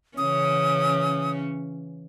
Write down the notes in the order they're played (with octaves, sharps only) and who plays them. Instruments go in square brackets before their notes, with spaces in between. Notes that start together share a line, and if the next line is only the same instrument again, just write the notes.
[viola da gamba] C#3 E3 C#4 [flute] D#6